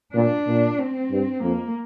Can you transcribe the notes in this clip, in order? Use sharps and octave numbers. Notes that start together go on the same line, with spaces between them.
A#2 D4
A#2
C4
G2
F2 A#3